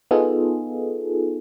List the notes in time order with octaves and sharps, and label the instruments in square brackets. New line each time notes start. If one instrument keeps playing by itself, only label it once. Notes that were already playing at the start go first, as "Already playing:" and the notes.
[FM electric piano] B3 D#4 F4 G#4 A4